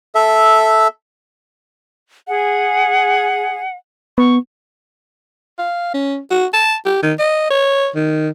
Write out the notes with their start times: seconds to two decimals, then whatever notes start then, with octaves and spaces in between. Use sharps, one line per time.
0.15 A4 E5
2.27 G#4 F#5
4.18 B3 C#6
5.59 F5
5.94 C#4
6.31 F#4
6.54 A5
6.86 G4
7.03 D#3
7.19 D#5
7.50 C#5
7.95 D#3